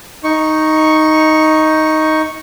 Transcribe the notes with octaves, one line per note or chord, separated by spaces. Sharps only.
D#4 C#6